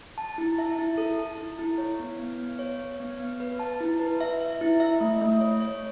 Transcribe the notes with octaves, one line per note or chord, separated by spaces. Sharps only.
A5
E4
E5
E4
A4
A5
E4
E4
C#5
B3
B3
B3
C#5
C#5
B3
B3
B4
A5
E4
B4
E5
E5
E4
E5
A3
A3
C#5
C#5